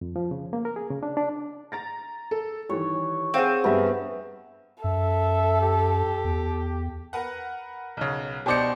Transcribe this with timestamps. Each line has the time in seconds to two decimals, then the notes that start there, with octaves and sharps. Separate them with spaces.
0.01 F2
0.16 F3
0.31 C#3
0.53 A#3
0.65 A#4
0.76 G#4
0.90 C#3
1.03 D4
1.17 D4
1.72 A#5 A6 A#6
2.31 A4
2.69 D#3 E3 G3 C#5
3.34 C4 G#4 F5 F#5
3.64 G2 G3 B3 E5
4.84 F#2 A4 E5
5.61 G4
6.24 E2
7.13 A#4 B4 F#5
7.97 B1 C#3
8.46 B2 D4 D#4 G4 C5 D5 C#7